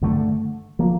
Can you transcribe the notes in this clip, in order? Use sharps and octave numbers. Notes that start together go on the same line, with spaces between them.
G2 D3 A3
F3 A#3